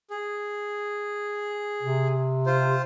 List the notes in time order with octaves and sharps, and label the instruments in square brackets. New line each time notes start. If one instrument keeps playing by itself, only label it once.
[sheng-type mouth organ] G#4
[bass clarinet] C3
[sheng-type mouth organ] F4 C5